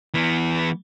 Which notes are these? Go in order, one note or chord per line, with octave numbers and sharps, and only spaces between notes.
E3 B3